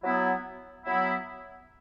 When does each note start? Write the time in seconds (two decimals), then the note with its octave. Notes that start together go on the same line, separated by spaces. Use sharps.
0.03 F#3 B3 E4
0.85 F#3 B3 E4